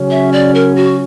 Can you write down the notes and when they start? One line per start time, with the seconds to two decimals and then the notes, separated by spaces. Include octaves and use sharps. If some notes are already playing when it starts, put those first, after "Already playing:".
Already playing: C#3 F#3 C#4
0.11 E5
0.33 D5
0.55 A#4
0.76 F#4